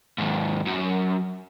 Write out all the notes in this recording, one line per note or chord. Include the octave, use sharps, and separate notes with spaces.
D#2 G#2
F#2